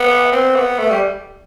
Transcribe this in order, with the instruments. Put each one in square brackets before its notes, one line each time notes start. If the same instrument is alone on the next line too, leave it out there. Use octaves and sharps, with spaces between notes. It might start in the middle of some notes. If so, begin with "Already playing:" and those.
Already playing: [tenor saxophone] B3
C4
B3
A3
G3